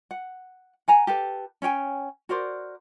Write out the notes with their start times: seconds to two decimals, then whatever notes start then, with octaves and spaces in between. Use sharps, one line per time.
0.11 F#5
0.88 F#5 G#5 A#5
1.07 G4 A4 B4
1.62 C#4 C#5 G5 G#5
2.29 F#4 A#4 C5 D5